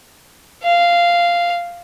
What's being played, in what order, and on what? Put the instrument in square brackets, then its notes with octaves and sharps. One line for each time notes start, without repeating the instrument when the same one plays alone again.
[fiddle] F5